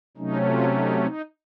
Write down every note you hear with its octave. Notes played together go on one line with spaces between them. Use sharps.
C3 F#3 A3 C#4 D#4
F4
D#4
D#4